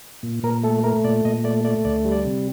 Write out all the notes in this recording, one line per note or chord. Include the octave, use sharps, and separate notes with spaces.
A#2
A#2 A#4
A3 A4
A3 A#4
A#2 D5
A#2 D#5
A3 D5
A3 D5
D2 D5
G3
D5
C3